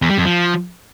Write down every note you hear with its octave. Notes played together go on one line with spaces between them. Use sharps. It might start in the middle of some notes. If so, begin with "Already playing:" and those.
E2
G3
F2
F3